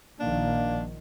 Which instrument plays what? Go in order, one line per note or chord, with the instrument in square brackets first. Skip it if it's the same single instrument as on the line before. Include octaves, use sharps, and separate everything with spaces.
[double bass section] A#1 D#3 [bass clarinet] A#3 [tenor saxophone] D4